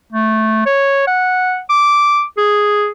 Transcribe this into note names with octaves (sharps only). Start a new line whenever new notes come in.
A3
C#5
F#5
D6
G#4